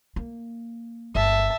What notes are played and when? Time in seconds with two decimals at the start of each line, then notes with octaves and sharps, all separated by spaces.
0.16 A#3
1.15 G1 E5 A5